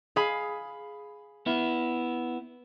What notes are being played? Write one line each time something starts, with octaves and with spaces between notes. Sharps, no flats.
G#4 F5 B5
B3 E4